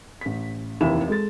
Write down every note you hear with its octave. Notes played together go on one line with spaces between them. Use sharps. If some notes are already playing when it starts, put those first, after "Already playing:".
A1 B6
F1 D#2 E3 E5 B5 E7
G#3 A4 A6